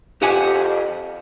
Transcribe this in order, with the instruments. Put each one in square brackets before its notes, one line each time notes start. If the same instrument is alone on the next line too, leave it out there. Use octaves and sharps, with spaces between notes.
[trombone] F2 [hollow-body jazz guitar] G4 F#5 G#5